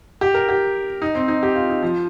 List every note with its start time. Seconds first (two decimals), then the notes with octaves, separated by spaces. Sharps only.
0.21 G4
0.34 A#4
0.49 G4
1.02 D#4
1.15 C4
1.28 D#4
1.43 G4
1.56 F4
1.69 D#4
1.83 F3